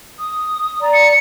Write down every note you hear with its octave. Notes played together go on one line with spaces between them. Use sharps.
D#6
D5 A#5
C#7